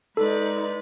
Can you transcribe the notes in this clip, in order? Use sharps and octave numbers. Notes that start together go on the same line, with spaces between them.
G#3 D#4 A4 B4 D5